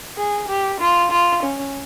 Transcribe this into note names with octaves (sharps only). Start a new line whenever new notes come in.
G#4
G4
F4
F4
C#4